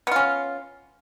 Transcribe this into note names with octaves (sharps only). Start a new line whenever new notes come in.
B3 C#4 F4